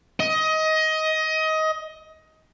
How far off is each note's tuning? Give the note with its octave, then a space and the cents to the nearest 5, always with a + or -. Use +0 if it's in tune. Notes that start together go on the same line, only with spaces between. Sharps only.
D#5 +20